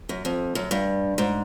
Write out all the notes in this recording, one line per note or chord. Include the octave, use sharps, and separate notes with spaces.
F#2
F2
F#2
G2
G#2